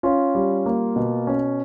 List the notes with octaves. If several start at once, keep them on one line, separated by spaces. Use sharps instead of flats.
C#4 F4
G3
A#3
B2
C#4